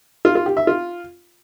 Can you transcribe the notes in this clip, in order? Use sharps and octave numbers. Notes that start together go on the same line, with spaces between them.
F4
F4
G4
E5
F4